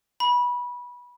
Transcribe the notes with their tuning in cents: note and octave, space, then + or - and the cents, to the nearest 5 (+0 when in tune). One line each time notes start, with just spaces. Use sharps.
B5 -20